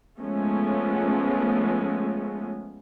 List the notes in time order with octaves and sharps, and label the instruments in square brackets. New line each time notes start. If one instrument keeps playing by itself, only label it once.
[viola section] F3 G#3 A3 B3 C#4